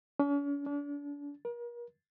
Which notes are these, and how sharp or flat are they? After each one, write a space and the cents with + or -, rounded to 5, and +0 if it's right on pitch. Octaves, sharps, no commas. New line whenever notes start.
C#4 +45
D4 -35
A#4 +40